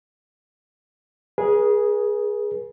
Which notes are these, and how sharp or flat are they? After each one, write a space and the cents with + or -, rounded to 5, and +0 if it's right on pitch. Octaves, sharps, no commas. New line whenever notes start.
G#4 +0 B4 -45